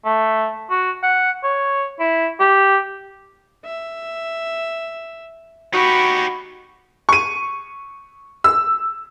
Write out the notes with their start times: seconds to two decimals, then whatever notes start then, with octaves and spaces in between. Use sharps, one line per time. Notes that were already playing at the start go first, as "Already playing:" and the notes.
0.05 A3
0.70 F#4
1.03 F#5
1.43 C#5
1.99 E4
2.40 G4
3.65 E5
5.74 D#4 F#4 G4 B5 C#6
7.09 C#6 D#7
8.44 E6